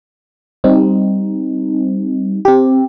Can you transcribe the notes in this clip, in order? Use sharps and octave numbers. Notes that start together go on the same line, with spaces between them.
G3 C4 D#4
C4 G4